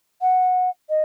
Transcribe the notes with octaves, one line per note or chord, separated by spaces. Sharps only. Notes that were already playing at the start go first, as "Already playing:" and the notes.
F#5
D#5